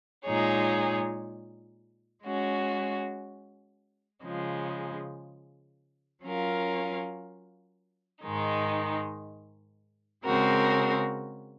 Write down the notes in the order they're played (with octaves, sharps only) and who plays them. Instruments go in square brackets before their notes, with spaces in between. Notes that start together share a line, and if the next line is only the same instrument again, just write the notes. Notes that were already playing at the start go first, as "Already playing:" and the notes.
[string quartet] A#2 G#3 D#4 G#4 C#5
G#3 C#4 F#4
C#3 F3 G#3
F#3 C#4 F4 A#4 F5
G#2 D#3 G#3 D#4
C#3 G#3 C4 F#4 A#4